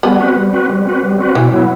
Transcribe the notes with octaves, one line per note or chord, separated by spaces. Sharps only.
G3 B3
C4 F#4 B4
G3
C4 F#4 B4
G3
C4 F#4 B4
G3
C4 F#4 B4
B2 E3
F#3 B3 E4